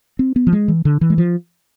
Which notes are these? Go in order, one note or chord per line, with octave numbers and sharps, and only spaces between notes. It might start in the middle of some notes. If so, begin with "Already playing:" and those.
C4
B3
F3
G#3
E3
D3
E3
G#3
F3